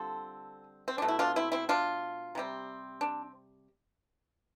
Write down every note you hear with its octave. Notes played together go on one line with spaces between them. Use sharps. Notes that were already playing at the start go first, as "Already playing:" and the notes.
Already playing: D3 G3 C4 F4 A4
C4
D4
B2 A3 C4
E4
D4 F4
C4 E4
C4 E4
D4 F4
C3 G3 C4
D4